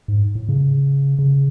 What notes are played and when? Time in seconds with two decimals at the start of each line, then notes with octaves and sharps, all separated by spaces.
0.08 G#2
0.35 A2
0.49 C#3
1.19 C#3